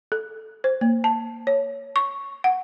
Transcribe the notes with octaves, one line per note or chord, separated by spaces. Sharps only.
A4
C5
A#3
A5
C#5
C#6
F#5